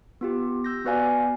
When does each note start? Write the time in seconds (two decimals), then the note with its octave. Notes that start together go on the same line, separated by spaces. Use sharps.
0.21 B3 F4 G4
0.64 E6 G6 A#6
0.85 B3 F#4 B4 D5 F5 G#5